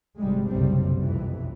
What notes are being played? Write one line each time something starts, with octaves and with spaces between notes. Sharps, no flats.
G#1 C3 G3 G#3
F#1 B1 C3 G3 C4
B1 F2 E3